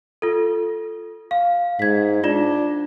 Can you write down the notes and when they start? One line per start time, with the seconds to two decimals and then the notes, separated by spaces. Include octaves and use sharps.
0.22 F4 A4
1.31 F5
1.79 G#2 G#6 B6
2.24 D4 F4 D5 E7